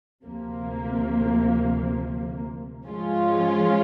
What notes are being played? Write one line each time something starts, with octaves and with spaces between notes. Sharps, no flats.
D2 C3 F3 A#3
G#2 F3 G#3 C#4 F4